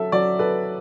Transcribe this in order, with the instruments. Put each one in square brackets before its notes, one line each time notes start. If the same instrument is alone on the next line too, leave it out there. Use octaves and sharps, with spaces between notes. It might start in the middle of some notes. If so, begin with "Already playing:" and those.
Already playing: [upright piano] F#3 A4 [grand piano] E5
[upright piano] F#3 [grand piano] D5
[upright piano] A4 [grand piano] B4